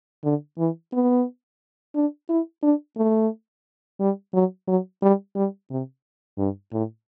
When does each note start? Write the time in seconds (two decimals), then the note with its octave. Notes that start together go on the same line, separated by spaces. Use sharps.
0.24 D3
0.58 E3
0.93 B3
1.95 D4
2.29 E4
2.63 D4
2.97 A3
4.00 G3
4.34 F#3
4.68 F#3
5.02 G3
5.36 G3
5.71 C3
6.38 G2
6.73 A2